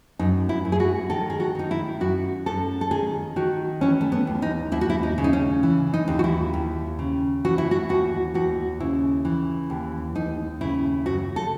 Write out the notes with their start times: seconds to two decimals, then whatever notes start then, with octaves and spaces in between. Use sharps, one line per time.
0.19 F#2 D#4
0.49 E4
0.65 F#2
0.72 G#4
0.80 F#4
1.10 D#3 A4
1.30 G#4
1.40 F#4
1.55 D#3 D#4
1.71 E4
2.00 F#2 F#4
2.46 F#2 A4
2.81 A4
2.91 D#3 G#4
3.36 D#3 F#4
3.81 E3 C#4
4.01 A3
4.12 B3
4.27 D#2
4.42 D#4
4.72 D#2 E4
4.81 F#4
4.90 E4
5.03 D#4
5.18 C#3
5.24 D#4
5.33 C#4
5.63 E3
5.94 D#4
6.08 D#2
6.19 F#4
6.24 E4
6.54 D#2
6.99 C#3
7.45 E3 F#4
7.58 E4
7.71 F#4
7.89 D#2 F#4
8.34 D#2 F#4
8.80 C#3 E4
9.25 E3
9.70 D#2
10.15 D#2 D#4
10.61 C#3 E4
11.06 F#2 F#4
11.36 A4